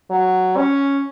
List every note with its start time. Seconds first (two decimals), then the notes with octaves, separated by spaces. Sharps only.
0.11 F#3
0.57 C#4